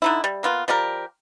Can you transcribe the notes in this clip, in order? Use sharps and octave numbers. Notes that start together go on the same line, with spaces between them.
D3 D#4 E4
G3
A#3 B3 F4
F3 G3 G4 A#4